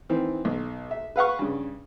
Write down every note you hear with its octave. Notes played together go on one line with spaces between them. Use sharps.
D#3 E3 C4
B1
E5
B4 F5 F#5 C#6
G2 C#3